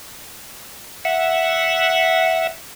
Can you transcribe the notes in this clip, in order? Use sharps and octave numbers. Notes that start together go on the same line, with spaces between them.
E5 F#5